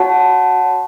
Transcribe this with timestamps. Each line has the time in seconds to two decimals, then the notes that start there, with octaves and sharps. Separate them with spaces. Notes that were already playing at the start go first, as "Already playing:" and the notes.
Already playing: F#4 C#5 F#5 A5